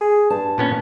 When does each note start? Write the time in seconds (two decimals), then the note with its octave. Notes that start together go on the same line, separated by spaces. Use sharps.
0.01 G#4
0.30 G2 A5
0.58 A#2 B3 C#4